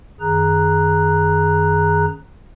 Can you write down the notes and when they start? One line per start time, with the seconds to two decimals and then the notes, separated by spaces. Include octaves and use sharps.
0.20 F#2 D#3 G#4 A#5 F#6